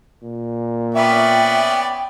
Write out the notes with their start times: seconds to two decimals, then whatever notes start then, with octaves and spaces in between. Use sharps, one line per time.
0.23 A#2
0.95 B3 C#4 D5 E5 G5